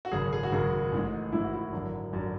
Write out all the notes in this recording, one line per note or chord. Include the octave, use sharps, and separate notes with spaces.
F#4
G#1 F#2 C#3 G#4
G#4
F#4
G#1 F#2 C#3 G#4
A1 G#2 G#3
A1 G#2 G#3 E4
F#4
E4
G#1 F#2 D3 F#3
G#1 F#2 D3 F#3